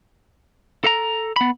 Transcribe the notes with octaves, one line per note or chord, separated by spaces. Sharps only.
A4 A#5
B3 B5